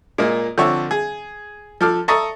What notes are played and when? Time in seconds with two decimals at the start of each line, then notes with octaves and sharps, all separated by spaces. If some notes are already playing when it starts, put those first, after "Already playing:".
0.18 A#2 G#3 A#3
0.58 D3 F3 C4 C#5 E5
0.91 G#4
1.81 F3 A4 D6 F6
2.08 A4 A5 A#5 C#6 D#6